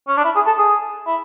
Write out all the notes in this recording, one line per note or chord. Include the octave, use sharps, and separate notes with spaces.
C#4
D4
E4
G#4
A4
G#4
E4